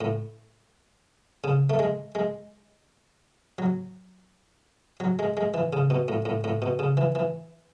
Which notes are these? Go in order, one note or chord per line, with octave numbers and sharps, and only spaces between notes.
A2
C#3
A3
G#3
G#3
F#3
F#3
G#3
G#3
E3
C#3
B2
A2
A2
A2
B2
C#3
E3
E3